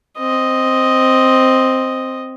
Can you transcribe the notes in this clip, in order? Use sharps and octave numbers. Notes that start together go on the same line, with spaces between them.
C4 D#5